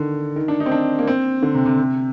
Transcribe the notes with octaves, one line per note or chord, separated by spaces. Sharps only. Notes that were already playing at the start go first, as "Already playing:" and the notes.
Already playing: D3 D#3
D#3
D4
D#4
C4
D4
A#3
C4
D3
C3
C3
C3